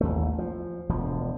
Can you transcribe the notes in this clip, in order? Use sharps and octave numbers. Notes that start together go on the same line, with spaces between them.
A1 D#2 A3
F3
E1 D2 F3